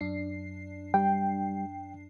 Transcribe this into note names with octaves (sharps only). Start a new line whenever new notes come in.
F#2 D4 C7
G3 G5